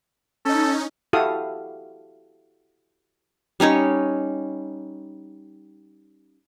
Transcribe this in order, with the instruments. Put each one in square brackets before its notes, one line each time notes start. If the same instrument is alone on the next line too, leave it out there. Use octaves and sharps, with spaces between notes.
[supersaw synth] C#4 D#4 [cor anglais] A4
[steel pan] E4 F#4 G4 A4 F5 D#6
[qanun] G3 C#4 D#4 C#5